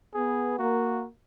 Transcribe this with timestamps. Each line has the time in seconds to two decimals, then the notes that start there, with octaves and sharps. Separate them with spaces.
0.14 B3 G#4
0.59 A#3 F#4